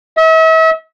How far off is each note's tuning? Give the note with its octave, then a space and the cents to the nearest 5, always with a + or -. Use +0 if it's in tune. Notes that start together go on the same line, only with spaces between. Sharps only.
E5 -40